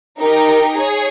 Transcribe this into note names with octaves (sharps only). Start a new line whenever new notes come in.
D#4 G4 A#4
G#4 C#5